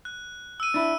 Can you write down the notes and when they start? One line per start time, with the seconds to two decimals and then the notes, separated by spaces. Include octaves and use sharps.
0.05 F#6
0.60 E6 D#7
0.74 D4 E4